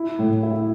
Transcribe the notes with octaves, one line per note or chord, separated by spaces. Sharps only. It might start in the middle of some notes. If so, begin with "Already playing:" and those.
Already playing: E4
A2
E4